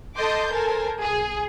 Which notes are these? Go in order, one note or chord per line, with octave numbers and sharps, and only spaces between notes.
A4 D#5 A5 C6 D6 G6
A4 A#4 C5 G#5 A5
B1 G#4